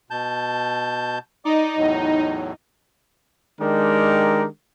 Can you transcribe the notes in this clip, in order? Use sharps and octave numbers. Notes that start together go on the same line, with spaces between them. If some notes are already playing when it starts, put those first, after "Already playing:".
B2 A5 G6
D#4 D5 D6
E2 A2 F#3
D#3 G#3 D4 G4 A#4